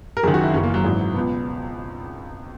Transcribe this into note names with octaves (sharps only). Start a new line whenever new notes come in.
A#4
F#1 F#2 D#3 G#4
F#4
E4
F#1 F#2 C#3 E3 C#4
A#3
F#3
G#1 G#2 E3
C#2 B2 B3